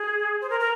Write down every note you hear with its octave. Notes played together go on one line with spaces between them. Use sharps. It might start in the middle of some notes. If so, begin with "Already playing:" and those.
Already playing: G#4
C5
A#4
A#4